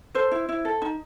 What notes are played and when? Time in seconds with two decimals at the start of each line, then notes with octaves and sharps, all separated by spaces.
0.15 A4 C5
0.31 E4
0.49 E4
0.65 A4
0.82 D#4